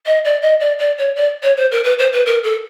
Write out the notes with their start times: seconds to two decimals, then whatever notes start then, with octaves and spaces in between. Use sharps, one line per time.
0.06 D#5
0.24 D5
0.42 D#5
0.60 D5
0.79 D5
0.98 C#5
1.16 D5
1.43 C#5
1.57 C5
1.71 A#4
1.84 B4
1.99 C5
2.12 B4
2.26 A#4
2.43 A4